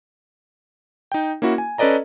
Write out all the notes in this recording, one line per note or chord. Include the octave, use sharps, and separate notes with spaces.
D#4 G5
A#3 C#4 E4 F#4
G#5
C#4 A4 B4 D5 D#5 A#5